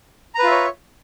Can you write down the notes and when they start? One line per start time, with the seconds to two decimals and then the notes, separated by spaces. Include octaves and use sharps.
0.35 A#5
0.39 B4
0.43 F4
0.47 E5
0.51 C#5